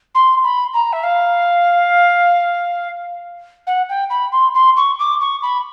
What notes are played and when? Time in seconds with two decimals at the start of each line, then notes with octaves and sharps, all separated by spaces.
0.15 C6
0.44 B5
0.74 A#5
0.93 E5
1.03 F5
3.67 F#5
3.89 G5
4.10 B5
4.32 C6
4.54 C6
4.76 C#6
4.99 D6
5.21 C#6
5.42 B5